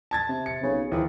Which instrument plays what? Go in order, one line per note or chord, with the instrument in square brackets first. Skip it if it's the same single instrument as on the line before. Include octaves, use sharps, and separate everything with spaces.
[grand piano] A5 G#6 A6
[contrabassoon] C3
[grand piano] C#7
[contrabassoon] B1 [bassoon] C#3
[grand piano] D#2 G#4 [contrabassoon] E3 [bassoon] F3